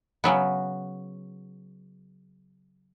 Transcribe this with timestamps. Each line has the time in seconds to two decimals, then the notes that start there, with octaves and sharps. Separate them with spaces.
0.24 C#3 F#3 B3